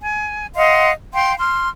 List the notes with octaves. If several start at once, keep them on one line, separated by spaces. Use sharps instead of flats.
G#5
D#5 F5 F#5 C6
F5 G5 C6
C6 F6